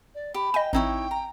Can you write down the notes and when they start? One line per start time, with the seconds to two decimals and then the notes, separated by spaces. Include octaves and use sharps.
0.14 D5
0.34 G4 B5
0.54 D#5 G5 G#5
0.73 A1 C4 D#4 E4 C#5 G5
1.11 A#5